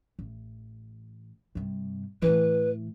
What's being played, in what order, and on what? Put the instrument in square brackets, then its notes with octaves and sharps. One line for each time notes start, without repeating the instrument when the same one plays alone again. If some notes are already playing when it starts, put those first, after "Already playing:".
[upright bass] A1
G2 C3
[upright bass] A2 E3 [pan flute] B4